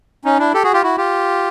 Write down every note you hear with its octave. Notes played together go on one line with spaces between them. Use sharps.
C#4 D#4
D4 E4
G4 A4
F#4 G#4
F4 G4
E4 F#4
F4 G4